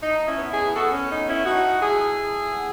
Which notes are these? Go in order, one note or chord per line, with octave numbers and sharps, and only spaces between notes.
A2 D#4
C#4 E4
B3
E4 G#4
B3 F#4 A4
C#4
A2 D#4
C#4 E4
A2 D#4 F#4
A2 E4 G#4
A2
B3